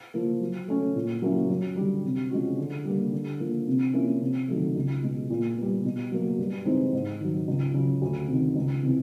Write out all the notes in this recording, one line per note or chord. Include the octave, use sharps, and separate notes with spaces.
F3 A#3
F#3
A3 C#4
A#2
F#3 A#3 C#4 E4
F#2
D3 G3
C3
F3 G#3 C#4 F#4
D3
G3 A#3
D3
F3 A#3
C3
F3 A#3 C#4 E4
C3
D#3 F#3 A3
C#2
B2 G#3
A#2
G3 B3
B2
F#3 A#3
G2
E3 G#3 C4 D#4
G#2
D#3 F#3
C#2
C#3 F#3
D2
C3 D#3
C#2
C3 E3